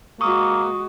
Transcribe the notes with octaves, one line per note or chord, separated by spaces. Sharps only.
G#3 A#3 F#4 C#6 D#6